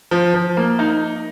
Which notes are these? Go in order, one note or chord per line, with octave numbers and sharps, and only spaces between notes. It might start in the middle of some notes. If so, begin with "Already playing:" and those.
F3
F3
A#3
D#4